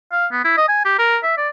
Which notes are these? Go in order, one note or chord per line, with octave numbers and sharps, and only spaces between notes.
F5
B3
E4
D#5
G#5
G4
A#4
E5
D5